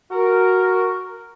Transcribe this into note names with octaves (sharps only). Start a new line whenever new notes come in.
F#4 A#4